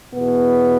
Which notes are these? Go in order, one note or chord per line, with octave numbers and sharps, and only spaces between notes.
E2 B2 B3